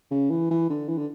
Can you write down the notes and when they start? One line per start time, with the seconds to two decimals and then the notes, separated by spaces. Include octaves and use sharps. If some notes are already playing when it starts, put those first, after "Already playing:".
0.11 C#3
0.31 E3
0.50 E3
0.70 D3
0.88 E3
0.98 D3